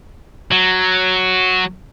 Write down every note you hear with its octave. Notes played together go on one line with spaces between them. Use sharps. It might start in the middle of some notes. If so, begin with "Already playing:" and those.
F#3